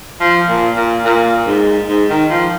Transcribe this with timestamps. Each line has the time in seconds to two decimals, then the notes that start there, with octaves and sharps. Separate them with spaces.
0.20 F3
0.48 A#2
0.77 A#2
1.05 A#2
1.47 G#2
1.88 G#2
2.10 D#3
2.30 F3